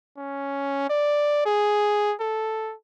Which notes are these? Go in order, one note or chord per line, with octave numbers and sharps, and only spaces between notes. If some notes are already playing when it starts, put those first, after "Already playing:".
C#4
D5
G#4
A4